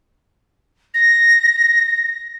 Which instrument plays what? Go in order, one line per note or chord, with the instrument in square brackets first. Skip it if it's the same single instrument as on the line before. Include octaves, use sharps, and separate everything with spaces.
[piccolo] A#6